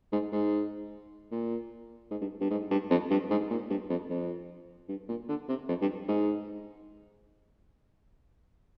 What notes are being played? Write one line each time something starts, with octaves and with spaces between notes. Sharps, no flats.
G#2
G#2
A#2
G#2
G2
G2
G#2
G2
F2
G2
G#2
A#2
G2
F2
F2
G2
A#2
D3
C3
F2
G2
G#2